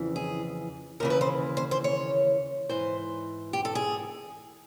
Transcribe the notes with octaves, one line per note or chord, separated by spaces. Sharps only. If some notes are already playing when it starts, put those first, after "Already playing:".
Already playing: F2 C#3 E3
G#4
D#2 C#3 E3 A#4
B4
C5
C5
C5
C#5
G#2 E3 C5
G4
A4
G#4